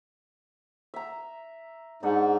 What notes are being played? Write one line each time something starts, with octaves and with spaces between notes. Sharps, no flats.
E5 A#5
G#2 D4 D#4 F#5